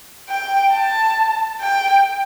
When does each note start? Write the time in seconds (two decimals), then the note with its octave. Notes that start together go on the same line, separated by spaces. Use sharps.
0.29 G5
0.73 A5
1.61 G5